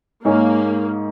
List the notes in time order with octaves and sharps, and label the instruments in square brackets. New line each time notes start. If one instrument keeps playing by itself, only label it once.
[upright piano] G#2 G#3 D#4 G#4 C#5 [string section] A#3